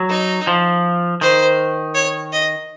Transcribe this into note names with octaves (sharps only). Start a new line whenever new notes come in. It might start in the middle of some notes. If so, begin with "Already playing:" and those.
Already playing: F#3
D#4
F3
D#3 C5
C#5
D#5